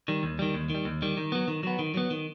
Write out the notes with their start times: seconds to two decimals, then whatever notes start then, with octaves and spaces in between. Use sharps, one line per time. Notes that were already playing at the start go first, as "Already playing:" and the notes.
0.08 D#3 G3
0.23 D#2
0.39 D#3 G3
0.54 D#2
0.70 D#3 G3
0.85 D#2
1.02 D#3 G3
1.17 D#3
1.32 F#3 B3
1.48 D#3
1.63 F#3 B3
1.79 D#3
1.94 F#3 B3
2.10 D#3